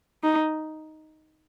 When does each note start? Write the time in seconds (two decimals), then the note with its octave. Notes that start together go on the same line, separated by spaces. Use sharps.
0.23 D#4